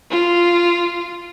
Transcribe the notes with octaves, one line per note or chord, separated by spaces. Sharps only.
F4